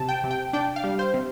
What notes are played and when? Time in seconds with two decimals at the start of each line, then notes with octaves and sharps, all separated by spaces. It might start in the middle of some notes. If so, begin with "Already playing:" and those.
Already playing: C3 A5
0.09 G5
0.24 C3
0.31 G5
0.53 D4 G5
0.76 F5
0.84 G3
0.99 C5
1.14 C3